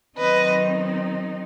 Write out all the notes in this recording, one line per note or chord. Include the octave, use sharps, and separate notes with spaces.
D#3 F#3 C4 D#4 B4 D#5